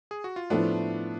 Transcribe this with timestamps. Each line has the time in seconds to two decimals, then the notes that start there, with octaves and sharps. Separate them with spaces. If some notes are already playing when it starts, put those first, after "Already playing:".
0.11 G#4
0.24 F#4
0.36 F4
0.50 A2 F3 A3 B3 D4 F4